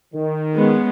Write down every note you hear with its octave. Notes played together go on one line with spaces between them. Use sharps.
D#3
G#3 B3 C#4